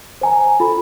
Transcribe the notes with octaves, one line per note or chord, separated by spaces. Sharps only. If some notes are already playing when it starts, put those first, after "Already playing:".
C5 G#5 A#5
F4 A4 B5